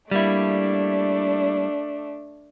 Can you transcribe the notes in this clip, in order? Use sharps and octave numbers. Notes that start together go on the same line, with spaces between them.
G3 A3 A#3 D4 E4